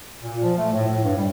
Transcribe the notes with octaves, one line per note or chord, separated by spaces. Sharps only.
A#2
F3
A3
A2
A2
G2
G3